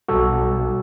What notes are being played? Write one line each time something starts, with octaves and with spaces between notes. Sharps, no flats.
B1 B2 G3 F#4 A4